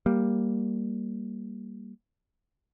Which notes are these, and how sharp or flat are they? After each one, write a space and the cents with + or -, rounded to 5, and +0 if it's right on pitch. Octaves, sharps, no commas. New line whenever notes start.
G3 +0 A#3 +0